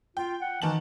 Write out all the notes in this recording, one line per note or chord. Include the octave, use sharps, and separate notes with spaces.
F4 G5
F#5
D#3 E3 A5 F#7